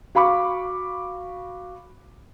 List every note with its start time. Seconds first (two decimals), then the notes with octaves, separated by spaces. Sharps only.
0.15 F#4 F5 B5 C#6 D6